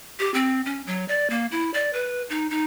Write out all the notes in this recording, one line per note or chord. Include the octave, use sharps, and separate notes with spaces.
G4
C4
C#4
F#3
D5
A#3
E4
D5
B4
D#4
D#4